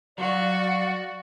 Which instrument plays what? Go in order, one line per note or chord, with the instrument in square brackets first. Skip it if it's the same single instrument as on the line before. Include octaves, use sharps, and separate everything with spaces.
[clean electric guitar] F#3 [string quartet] F#4 [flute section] D5 F5